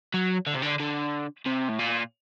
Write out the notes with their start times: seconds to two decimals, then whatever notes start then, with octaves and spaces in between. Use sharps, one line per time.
0.14 F#3
0.47 D3
0.54 C3
0.62 D3
0.80 D3
1.46 C3
1.69 A2
1.79 A#2